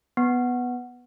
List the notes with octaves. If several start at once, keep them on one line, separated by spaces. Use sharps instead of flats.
B3